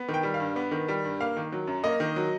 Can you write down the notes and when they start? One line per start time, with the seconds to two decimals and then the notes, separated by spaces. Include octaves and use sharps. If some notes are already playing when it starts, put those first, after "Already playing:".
Already playing: B3
0.08 D#3
0.14 G5
0.23 G3
0.34 F5
0.40 G2
0.56 B3
0.71 D#3
0.88 G3
1.05 G2
1.20 A#3 F5
1.37 D#3
1.52 F#3
1.67 F#2
1.84 A#3 D#5
2.00 D#3
2.16 F#3